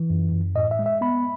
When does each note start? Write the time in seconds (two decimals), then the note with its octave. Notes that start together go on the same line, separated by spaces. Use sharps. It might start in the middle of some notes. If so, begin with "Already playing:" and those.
Already playing: E3
0.10 F#2
0.32 F#2
0.55 A2 D#5
0.71 E5
0.79 G#3
0.86 E5
1.01 B3 B5